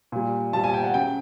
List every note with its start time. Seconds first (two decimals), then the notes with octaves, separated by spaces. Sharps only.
0.12 A#2 G3
0.53 A#2 G3 A5
0.64 G#5
0.74 G5
0.84 F#5
0.94 C#3 F#3 G5